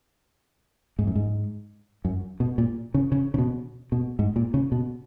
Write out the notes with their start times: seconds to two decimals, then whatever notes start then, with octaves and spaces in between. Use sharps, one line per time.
0.99 G#2
1.07 F#2
1.15 G#2
2.05 F#2
2.40 B2
2.58 A#2
2.94 C#3
3.12 C#3
3.34 C#3
3.38 B2
3.92 B2
4.19 G#2
4.36 A#2
4.54 C#3
4.72 B2